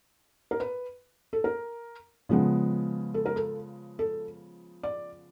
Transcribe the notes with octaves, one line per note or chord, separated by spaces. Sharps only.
A#4
B4
A4
A#4
C#3 F3 G#3 B3
A4
A#4
A4
A4
D5